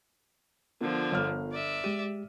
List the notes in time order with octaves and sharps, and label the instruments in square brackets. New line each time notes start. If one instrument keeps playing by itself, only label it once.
[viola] D3 F3 [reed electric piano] B3 F4 A#4
[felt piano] G1 F6
[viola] D5 E5
[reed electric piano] G#3 G4 [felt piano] D#7